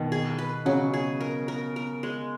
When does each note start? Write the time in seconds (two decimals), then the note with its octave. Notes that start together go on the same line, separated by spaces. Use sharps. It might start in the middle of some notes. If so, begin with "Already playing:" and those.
Already playing: B2 D#3
0.12 G#4
0.39 B4
0.65 C#3 F#3
0.94 G#4
1.21 A#4
1.48 A#4
1.76 A#4
2.03 G#3